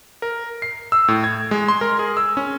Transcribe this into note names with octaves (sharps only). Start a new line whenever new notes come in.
A#4
C7
E6
A2
G#6
G#3
C6
A#4
G#4
E6
C#4